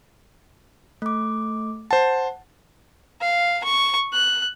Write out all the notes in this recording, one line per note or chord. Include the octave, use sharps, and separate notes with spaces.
A3 D6
C5 F#5 A5
F5
C#6
F#6